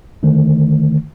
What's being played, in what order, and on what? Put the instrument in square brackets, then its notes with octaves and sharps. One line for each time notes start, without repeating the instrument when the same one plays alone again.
[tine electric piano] D3 D#3 A3